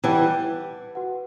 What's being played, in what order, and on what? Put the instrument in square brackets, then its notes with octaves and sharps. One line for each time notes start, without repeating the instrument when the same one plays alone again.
[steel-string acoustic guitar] E3 G3 [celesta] B4 F#5 A5 D6
[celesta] F#4 B4 F#5